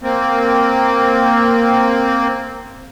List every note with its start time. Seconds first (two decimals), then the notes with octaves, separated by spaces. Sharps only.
0.02 A#3 C4